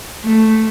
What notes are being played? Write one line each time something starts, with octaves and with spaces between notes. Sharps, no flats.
A3